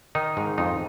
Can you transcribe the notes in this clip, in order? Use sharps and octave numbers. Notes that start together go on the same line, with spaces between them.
D#3 D#4
G#2
F2 D#4